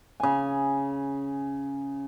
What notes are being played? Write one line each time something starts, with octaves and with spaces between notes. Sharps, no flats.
C#3 G#5